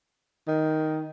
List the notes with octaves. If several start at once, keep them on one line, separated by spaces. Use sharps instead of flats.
D#3